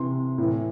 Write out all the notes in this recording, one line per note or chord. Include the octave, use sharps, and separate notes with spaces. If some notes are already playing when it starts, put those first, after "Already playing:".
Already playing: C3 E3 C6
A2 E3